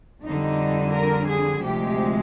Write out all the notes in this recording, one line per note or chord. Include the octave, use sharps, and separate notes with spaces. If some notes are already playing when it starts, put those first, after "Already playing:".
F2 D3 G3 D#4
A#4
G#4
D2 C3 F3 G#3 G4